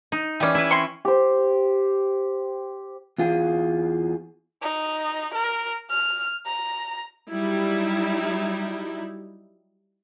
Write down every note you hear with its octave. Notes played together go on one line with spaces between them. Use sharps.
D#4
E3 G3 C#4 D5
E4 B4
C4 C6 C#6
G4 C5
E2 F4 G#4
D#4
A#4
F6
A#5
F#3 G3 D#4 E4